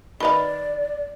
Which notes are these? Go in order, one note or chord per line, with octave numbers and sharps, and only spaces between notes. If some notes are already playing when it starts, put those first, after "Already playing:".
D#3 B4 D5 F5 B5